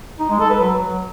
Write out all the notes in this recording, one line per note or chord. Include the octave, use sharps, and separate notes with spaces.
D#4
G#3
A4
B4
F#3